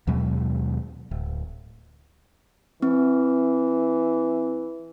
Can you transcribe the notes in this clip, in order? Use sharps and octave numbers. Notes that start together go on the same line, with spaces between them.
D#2 B2 F#3 G#3
D1
E3 C4